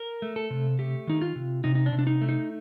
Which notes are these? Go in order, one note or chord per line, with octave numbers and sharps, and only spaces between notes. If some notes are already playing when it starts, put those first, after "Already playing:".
Already playing: A#4
A3
A4
C3
A3 G4
D#3 D#4
F4
C3
C3 D#4
D#4
D4
C3
D4
D#4
A3
D#4